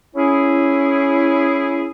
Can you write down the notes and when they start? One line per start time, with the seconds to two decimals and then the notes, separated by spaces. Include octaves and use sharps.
0.15 C#4 E4 G#4